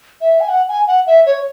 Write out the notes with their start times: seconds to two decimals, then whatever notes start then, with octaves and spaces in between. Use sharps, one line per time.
0.21 E5
0.40 G#5
0.49 F#5
0.69 G#5
0.87 F#5
1.07 E5
1.26 C#5